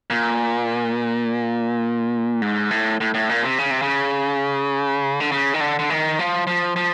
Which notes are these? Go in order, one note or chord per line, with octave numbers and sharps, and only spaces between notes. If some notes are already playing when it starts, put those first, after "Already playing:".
A#2
G#2
A2
A2
A2
A#2
C3
C#3
C3
C#3
D3
C#3
D#3
D3
D3
D#3
F3
F3
F3